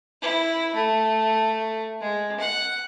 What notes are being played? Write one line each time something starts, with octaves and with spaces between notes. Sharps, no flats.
E4
A3
G#3
F#5